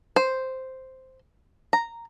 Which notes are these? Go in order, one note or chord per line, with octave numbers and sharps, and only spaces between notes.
C5
A#5